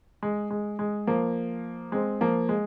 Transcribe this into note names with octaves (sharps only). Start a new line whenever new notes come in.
G#3
G#3
G#3
F3 A#3
G#3 C4
F3 A#3
G#3